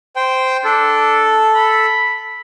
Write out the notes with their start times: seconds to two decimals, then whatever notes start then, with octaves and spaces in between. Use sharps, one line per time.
0.16 C5 G5
0.64 D4 A4
1.55 B5